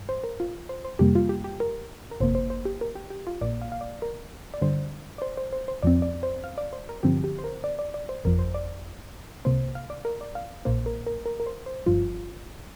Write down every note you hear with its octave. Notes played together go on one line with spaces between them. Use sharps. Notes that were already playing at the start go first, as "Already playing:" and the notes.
Already playing: G2
C5
A#4
F4
C5
C5
F2 C3 G3 A#3 G4
F4
G4
G4
A#4
A#4
G1 F2 C3 A#3 C5
C5
C5
G4
A#4
G4
G4
F4
A#1 A#2 A#3 D5
F5
F5
D5
A#4
D5
G2 D3 G3 C5
D5
C5
C5
C5
C5
F2 F3 C4 D5
D5
C5
F5
D5
C5
A#4
G2 D3 F3 C4 G4
G4
C5
A#4
D5
D5
D5
C5
G1 F2 F3 A#4
C5
D5
C2 C3 A#3 C5
F5
D5
A#4
D5
F5
A#1 A#2 A#3 C5
A#4
A#4
A#4
A#4
C5
C5
G1 G2 F3 F4